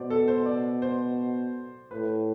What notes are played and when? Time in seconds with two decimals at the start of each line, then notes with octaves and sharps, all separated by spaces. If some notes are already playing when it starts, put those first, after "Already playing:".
Already playing: B2 C5 D5
0.10 A4
0.28 C5
0.46 D5
0.82 C5
1.91 A2 B4